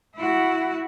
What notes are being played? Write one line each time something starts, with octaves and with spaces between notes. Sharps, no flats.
E4 F#4